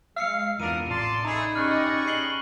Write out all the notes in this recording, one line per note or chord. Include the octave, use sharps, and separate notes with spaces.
G#3 F5 E6 C7 C#7
E2 C3 B3 D4 F4 A#4 D#7
A1 D5 A5 C6
A3 D#4 G#4 A#5 B5
C#4 G4 G#4 D5 D#5 C#6 F6 F#6
C7 F#7 G7